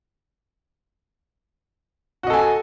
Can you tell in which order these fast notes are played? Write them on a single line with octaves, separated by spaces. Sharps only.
F#4 D#5 A4 G#5